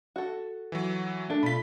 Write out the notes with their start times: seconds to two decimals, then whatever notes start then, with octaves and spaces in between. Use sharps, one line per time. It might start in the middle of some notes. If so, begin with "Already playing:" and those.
0.16 F#4 A4
0.72 E3 F#3
1.30 A3 D4 A4
1.43 B2 F4 B5 B6